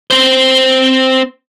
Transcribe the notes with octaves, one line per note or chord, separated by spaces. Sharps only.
C4 C5